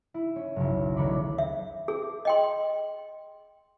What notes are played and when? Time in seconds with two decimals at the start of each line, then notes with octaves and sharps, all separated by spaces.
0.14 E4
0.36 C#4
0.56 F#1 B1
0.96 D2 D#3 C#5 B5 D6
1.38 E5
1.88 G#4
2.25 D#5 G5 C6